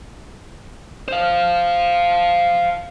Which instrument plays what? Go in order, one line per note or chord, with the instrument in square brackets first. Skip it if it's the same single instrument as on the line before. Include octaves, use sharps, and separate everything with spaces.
[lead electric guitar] C5 F5